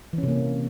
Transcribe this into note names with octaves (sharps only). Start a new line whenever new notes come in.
E3
C#4
C3
A#3